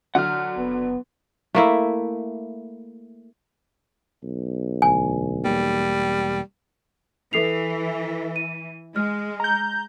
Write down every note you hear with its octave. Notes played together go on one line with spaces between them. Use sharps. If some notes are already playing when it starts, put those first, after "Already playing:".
D3 F#3 F#5 F6
F#1 B3
A3 A#3 E4
B1
E1 D2 G#5
E1 F2 G3 A#3
E3 A4 C7 F7
D#7
G#3 F6
A#5 G6